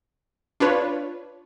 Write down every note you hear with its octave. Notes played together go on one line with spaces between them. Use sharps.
D4 F4 B4 C#5